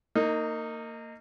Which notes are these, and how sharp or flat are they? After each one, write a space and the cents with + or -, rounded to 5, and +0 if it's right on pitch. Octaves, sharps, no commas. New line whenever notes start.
A#3 -25 D#4 +0